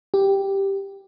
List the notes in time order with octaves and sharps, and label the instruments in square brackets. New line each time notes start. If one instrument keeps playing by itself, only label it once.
[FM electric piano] G4